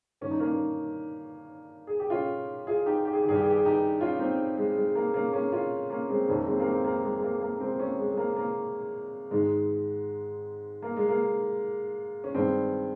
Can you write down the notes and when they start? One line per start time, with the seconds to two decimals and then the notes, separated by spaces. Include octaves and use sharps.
0.21 G2 D#3 C#4
0.31 D#4
0.40 A#3 C#4
1.87 G#4
2.00 G4
2.10 C#4 F4
2.67 F4 G#4
2.86 D#4 G4
3.05 G4
3.13 G#4
3.21 G4
3.25 G2 D#3 G#4
3.36 G4
3.43 G#4
3.50 G4
3.58 G#4
3.65 D#4 G4
4.00 C#4 F4
4.19 C4 D#4
4.57 G#3
4.76 G#3
4.95 A#3
5.14 A#3 C#4
5.33 A#3 C#4
5.52 C#4 F4
5.90 A#3 C#4
6.09 G#3 C4
6.28 F2 C3 D#3 A#3 C#4
6.46 G#3 C4
6.60 A#3
6.66 G#3 C4
6.85 A#3
7.03 G#3
7.17 G#3
7.23 A#3
7.42 A#3
7.60 G#3 C4
7.80 A#3 C#4
7.99 G#3
8.11 G#3
8.17 A#3
8.36 A#3
9.31 G#2 D#3 G#3
10.82 A#3
10.96 G#3
11.09 A#3
12.24 C#4
12.34 G2 D#3 G#3 C4